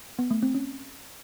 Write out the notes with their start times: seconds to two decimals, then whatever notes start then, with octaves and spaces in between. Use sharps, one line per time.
0.19 B3
0.31 A3
0.43 C4
0.55 C#4